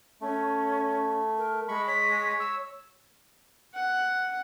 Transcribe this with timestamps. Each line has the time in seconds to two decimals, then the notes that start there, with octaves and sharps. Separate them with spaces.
0.21 A3 C#4
1.38 A#4
1.68 G#3 B5 C#6
1.88 C#5 B6
2.40 E6
3.75 F#5